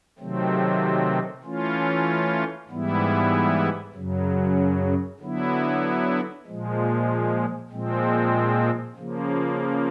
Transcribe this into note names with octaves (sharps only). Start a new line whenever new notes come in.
C3 D#3 F#3 A3 C4
E3 A3 C#4 F4
G#2 E3 G3 B3 E4
F#2 C#3 F#3
D3 F#3 B3 E4
A#2 F3 G#3
A#2 F3 G#3 C4
C#3 F3 A#3